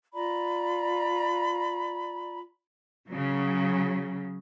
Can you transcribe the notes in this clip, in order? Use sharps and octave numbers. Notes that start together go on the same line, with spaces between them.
F4 D5 A#5 B5
C#3 F#3